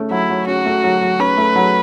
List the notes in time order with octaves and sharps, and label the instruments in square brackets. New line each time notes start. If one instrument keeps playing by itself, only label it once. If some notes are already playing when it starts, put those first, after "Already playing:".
Already playing: [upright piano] A3 C#4
[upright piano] F#3 [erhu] E4
[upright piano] F#3
[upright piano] C#4 [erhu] F#4
[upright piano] A3
F#3
F#3
[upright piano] C#4 [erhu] B4
[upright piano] A3
F#3